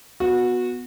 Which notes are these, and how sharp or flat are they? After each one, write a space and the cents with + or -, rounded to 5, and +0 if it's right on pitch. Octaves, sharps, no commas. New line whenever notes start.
B3 +0 F#4 -20